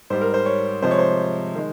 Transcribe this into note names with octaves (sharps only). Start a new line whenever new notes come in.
G#2 G3 C5
A#4
C5
C#5
C3 F3 G#3 C5
C#5
C5
D#3 G#3